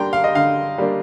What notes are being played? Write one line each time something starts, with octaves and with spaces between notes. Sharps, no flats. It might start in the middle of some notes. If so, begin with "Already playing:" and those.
Already playing: G3 A#3 D4 G5 A#5 C6
F5
D#5
D3 F5
G3 A#3 D4